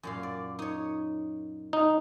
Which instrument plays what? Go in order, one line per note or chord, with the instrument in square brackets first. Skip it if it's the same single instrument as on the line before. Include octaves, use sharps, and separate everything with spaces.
[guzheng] F#2 A#2 F5
D5
D#4 C#5
[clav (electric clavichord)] D#4